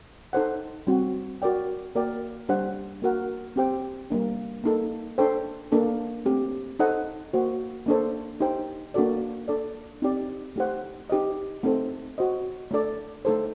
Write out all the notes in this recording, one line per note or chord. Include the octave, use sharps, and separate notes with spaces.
D#4 A4 C5 F#5
G3 C4 F#4
F#4 A#4 D5 G5
A#3 F#4 A#4 D5 G5
G3 D4 G4 C5 F#5
A#3 F#4 A#4 F#5
C4 G4 C5 G5
G3 A#3 D4
A#3 D#4 A4
D4 A4 C5 G5
A#3 D4 A4
A3 C4 G4
D#4 A4 C5 D#5 F#5
A#3 F#4 C5
A#3 D4 A4 C5
D#4 G4 C5 G5
A#3 D4 F#4 A4 D5
D4 A4 D5
C4 D#4 G4 D5
A3 D#4 G4 C5 F#5
D#4 G4 C5 D#5
A3 C4 D#4 A4 C5
F#4 C5 D#5
A3 D4 A4 D5
A3 D#4 A4 C5